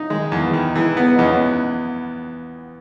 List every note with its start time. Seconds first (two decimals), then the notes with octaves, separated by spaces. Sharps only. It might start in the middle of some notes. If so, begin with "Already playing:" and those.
Already playing: D#4
0.10 D#3 G#3
0.32 E2
0.43 E3
0.53 D#3
0.75 E3 G#3
0.97 B3
1.16 E2 D#4
1.24 C#4
1.32 B3